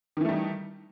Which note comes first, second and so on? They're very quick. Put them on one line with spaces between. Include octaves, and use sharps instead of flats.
D#3 E3 A3 G3 D#4